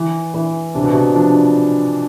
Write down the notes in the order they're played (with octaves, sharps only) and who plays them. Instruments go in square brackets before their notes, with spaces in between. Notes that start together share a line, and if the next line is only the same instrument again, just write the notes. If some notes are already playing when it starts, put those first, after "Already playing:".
Already playing: [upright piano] E3
E3
[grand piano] C3 [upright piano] D4
[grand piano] B2
C3
[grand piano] F3 [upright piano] D4